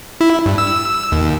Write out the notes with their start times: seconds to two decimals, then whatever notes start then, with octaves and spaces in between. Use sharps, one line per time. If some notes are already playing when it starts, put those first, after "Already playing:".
0.21 E4
0.46 G2
0.58 E6
1.12 D#2